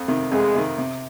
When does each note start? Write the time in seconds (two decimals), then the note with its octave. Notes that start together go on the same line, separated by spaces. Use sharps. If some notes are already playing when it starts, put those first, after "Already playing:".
Already playing: F2
0.08 C3 D#3
0.31 F2 G#3
0.55 C3 D#3
0.78 C3